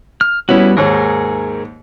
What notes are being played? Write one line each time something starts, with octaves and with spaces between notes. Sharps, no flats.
F6
G3 B3 C#4 E4 F#4
D#2 G#2 G#4 A#4 C#5